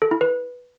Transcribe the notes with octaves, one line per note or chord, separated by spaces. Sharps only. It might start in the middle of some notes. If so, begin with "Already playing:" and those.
A4
E4
B4